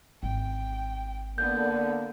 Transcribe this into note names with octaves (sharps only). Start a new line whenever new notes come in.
G#1 G5
D3 A#3 B3 G6